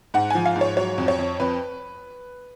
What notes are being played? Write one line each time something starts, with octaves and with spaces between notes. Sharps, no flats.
G#2 F#5
F3 G#5
F5
G#2
C#5
F#3 C#5
F2
C#5
F2
F2 B4